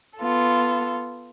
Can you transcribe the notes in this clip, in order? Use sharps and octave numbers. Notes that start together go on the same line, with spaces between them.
B3 F4 A4